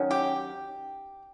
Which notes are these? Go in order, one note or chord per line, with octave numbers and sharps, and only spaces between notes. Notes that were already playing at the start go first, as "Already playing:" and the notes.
Already playing: D#3 F#3 C#4
G4